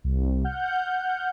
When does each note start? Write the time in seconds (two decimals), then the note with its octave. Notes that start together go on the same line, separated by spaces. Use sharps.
0.04 C2
0.44 F#5 F6 G6